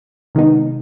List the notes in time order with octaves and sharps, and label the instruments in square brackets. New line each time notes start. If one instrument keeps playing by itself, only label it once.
[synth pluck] C3 D#3 G#3 B3 D#4